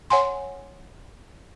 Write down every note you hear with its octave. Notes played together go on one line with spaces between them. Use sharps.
C#5 F#5 G#5 C6